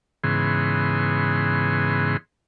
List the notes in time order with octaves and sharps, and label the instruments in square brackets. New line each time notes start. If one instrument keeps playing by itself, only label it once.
[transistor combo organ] G#2 C#3 E3 B3 G#4 C6